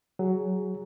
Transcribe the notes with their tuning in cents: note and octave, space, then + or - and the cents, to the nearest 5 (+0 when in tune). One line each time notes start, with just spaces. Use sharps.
F#3 +15 G#4 +0